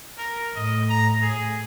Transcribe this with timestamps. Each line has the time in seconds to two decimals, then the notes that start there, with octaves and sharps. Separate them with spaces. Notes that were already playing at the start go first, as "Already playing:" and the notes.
0.18 A#4
0.56 A2 D#5
0.89 A#5
1.22 G#4